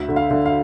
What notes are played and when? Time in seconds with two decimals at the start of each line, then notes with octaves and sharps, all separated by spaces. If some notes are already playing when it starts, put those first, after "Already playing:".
Already playing: D2 E5
0.09 D3
0.16 F5
0.31 D3
0.46 F5